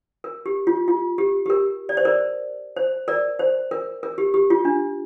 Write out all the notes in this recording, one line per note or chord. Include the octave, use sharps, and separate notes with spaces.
A#4
G4
F4
F4
G4
G4
A#4
D5
C5
A#4 D5
C5
A#4 D5
C5
A#4
A#4
G4
G4
F4
D4